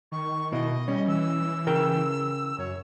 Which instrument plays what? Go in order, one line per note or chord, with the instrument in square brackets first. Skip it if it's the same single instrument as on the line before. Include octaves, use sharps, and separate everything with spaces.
[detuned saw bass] D#3 [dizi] C#6
[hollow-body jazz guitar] B2 E4 [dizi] D#5
[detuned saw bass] G3 [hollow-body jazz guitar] C#4
[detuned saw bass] E3 [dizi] E6
[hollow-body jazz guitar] C#3 A#4 G5
[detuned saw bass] F#2 [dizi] C#5